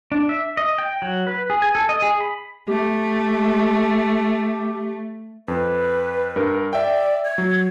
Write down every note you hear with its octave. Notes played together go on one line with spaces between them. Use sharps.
D4
E5
D#5
G5
F#3
B4
G#4
G#5
A4
D#5
G#4
B5
A3 G4
F2 B4
G2 A#4
D5 E5 G5
G#6
F#3